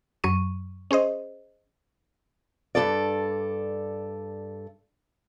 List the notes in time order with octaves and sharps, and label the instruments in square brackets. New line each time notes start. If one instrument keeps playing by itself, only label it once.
[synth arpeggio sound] F#2 F#3 C#6 D#7
C#4 G#4 C5 D#5
[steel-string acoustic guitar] G2 A#2 A4 D5